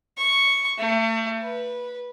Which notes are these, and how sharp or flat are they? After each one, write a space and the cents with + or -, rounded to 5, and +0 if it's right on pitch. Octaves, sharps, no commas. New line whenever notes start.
C#6 +0
A3 +35
B4 -15